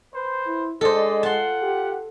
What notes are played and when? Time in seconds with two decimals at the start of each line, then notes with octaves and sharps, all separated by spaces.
0.12 B4 C5
0.46 E4
0.81 G#3 D4 A4 C5 D5 D#5
1.23 F4 F#5 A5 C6
1.63 G4